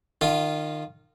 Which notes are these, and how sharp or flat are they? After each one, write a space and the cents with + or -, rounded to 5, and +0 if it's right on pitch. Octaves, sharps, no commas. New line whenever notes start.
D#3 -30 F4 -10